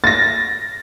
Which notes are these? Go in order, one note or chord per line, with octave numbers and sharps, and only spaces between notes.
A6 A#6